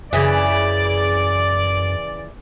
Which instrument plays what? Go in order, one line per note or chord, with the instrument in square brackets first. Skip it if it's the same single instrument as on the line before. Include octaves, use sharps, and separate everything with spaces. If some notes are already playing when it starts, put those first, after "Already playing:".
[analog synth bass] F#2 [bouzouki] C#3 E3 [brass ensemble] D5